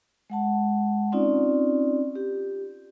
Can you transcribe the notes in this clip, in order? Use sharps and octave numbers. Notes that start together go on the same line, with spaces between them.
G#3 F#5 A5
C4 C#4 D#4 F4 D5
G4